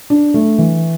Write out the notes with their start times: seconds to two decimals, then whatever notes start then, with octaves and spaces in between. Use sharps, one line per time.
0.10 D4
0.34 A3
0.58 E3